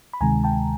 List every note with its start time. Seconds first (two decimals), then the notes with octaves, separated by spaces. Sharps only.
0.13 B5
0.21 D2 C3 D#3 G#3 G#5 A#5
0.44 G5 A5